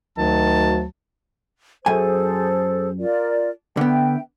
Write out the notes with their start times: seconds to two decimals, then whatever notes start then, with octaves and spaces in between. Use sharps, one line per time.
0.18 D2 D#3 F#3 A5
1.86 F#2 G#4 A4 C5 G#5
2.99 F4 A#4 D5
3.77 D3 B3 E5 G5